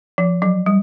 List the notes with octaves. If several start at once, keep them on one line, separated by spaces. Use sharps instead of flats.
F3
F#3
G3